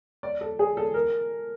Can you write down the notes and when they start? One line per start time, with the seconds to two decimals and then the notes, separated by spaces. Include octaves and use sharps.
0.23 D5
0.41 A4
0.59 G#4
0.77 A4
0.94 A#4